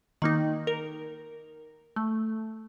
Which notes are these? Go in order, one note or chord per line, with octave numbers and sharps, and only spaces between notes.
D#3 A#3 D#4
A#4
A3